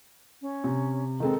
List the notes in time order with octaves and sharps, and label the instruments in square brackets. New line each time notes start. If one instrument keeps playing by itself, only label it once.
[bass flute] C#4
[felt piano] C3
[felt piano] D#3 G#3 C4 [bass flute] A4